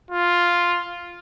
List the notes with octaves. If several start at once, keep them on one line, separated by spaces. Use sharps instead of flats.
F4